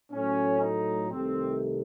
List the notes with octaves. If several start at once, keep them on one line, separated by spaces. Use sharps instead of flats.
A2 F#3 A3 C#4
D#4
C2 C3 D#3 A3 C4